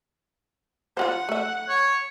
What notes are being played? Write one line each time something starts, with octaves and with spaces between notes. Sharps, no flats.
F4 G4 C5 F#5
A3 E5
C#5